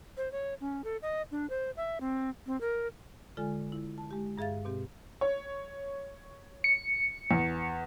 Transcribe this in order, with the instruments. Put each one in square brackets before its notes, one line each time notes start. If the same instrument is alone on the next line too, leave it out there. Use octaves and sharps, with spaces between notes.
[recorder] C5
C#5
C#4
A4
D#5
D4
C5
E5
C4
C4
A#4
[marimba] D3 G#3 F4 A4 G#5
E4
A5
G#3 G4
G2 G#4 E5 F5 A6
B2 C4 G4
[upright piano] C#5
[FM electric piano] C#7
[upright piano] E2